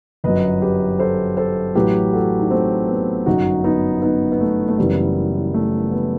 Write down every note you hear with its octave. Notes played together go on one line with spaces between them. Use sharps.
G1 F#2 F#3 B4 D#5
G4 B4
A4 C5
A4 C5
A1 A2 F#3 G4 B4
F#4 A4
D#4
A3 C4
B3
G1 F#2 F#3 D#4 F#4
B3 D#4
B3 D#4
B3
A3
A3
F#1 F#2 E3 G3 B3
A3
B3